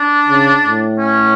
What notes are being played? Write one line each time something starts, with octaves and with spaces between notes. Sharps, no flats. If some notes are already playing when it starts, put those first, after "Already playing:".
Already playing: D4
C#3
A2
C#4